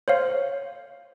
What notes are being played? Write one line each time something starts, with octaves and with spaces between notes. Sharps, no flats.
C5 C#5 F5